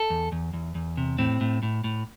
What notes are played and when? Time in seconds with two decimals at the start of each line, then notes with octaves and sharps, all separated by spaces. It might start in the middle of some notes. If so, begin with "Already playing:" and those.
Already playing: A4
0.10 E2
0.32 E2
0.53 E2
0.75 E2
0.97 C3
1.19 A2 C4
1.41 A2
1.63 A2
1.84 A2